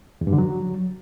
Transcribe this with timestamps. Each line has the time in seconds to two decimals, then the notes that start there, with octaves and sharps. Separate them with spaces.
0.21 E2
0.27 G2
0.33 D3
0.38 F#3